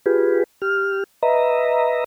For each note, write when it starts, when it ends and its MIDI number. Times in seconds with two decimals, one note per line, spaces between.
0.06 0.44 65
0.06 0.44 67
0.06 0.44 68
0.06 0.44 71
0.62 1.04 67
0.62 1.04 89
1.23 2.04 71
1.23 2.04 75
1.23 2.04 76
1.23 2.04 82